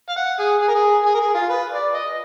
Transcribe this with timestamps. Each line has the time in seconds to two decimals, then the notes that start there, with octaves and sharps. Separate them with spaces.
0.09 F5
0.17 F#5
0.39 G#4
0.61 G#4
0.68 A#4
0.75 G#4
1.05 G#4
1.15 A#4
1.20 G#4
1.35 F4
1.49 B4
1.72 D5
1.94 D#5